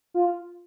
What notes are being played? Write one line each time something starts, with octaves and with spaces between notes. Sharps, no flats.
F4